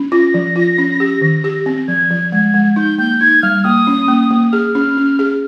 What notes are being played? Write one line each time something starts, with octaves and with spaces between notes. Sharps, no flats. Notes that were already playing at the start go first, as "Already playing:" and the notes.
Already playing: C#4
F4 A#6
F3
F4
C#4
G4
D#3
G4
C4
F3 G#6
F3
G#3
G#3
D#4 G6
A#3 G6
D#4 G#6
G3 F6
A#3 D#6
C#4
A#3
A#3
G#4 F6
C#4
C#4
G#4